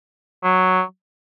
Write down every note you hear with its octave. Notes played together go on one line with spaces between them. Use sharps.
F#3